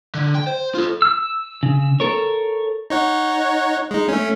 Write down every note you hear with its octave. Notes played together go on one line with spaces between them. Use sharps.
D3
G5
C5
F4 A4
E6
C#3
A4 A#4 C#5
D#4 C#5 F#5
G#3 D#4
A3 C#4